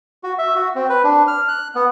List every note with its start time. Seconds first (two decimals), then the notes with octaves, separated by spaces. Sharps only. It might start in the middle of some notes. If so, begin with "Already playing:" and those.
0.24 F#4
0.39 E5
0.56 F#4
0.75 C4
0.89 B4
1.04 D4
1.28 F6
1.48 F#6
1.75 B3